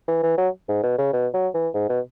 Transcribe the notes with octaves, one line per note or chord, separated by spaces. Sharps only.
E3
E3
F#3
G#2
B2
C#3
B2
F#3
E3
G#2
B2